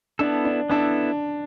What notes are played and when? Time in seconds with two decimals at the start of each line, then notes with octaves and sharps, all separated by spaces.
0.19 B3 D4 E4 A4
0.45 D4
0.70 B3 D4 E4 A4